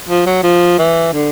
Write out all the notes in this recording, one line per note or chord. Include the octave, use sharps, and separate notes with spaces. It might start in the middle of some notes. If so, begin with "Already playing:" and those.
F3
F#3
F3
E3
D3